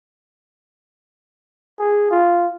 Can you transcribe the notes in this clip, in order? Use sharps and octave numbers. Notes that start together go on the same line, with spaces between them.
G#4
F4